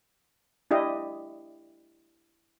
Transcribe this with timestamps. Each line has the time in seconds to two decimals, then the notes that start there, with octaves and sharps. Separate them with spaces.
0.71 D4 E4 G4 D#5